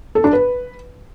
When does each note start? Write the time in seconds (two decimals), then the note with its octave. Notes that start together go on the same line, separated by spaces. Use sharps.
0.15 A4
0.24 D4
0.33 B4